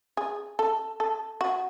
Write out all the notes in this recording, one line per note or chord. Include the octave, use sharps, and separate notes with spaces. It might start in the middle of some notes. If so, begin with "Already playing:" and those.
G#4
A4
A4
F#4